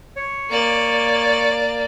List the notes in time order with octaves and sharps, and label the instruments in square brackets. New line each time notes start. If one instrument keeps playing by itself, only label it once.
[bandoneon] C#5
[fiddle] A#3 D5